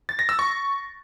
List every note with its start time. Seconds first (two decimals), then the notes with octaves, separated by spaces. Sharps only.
0.09 A6
0.19 A#6
0.29 E6
0.39 C#6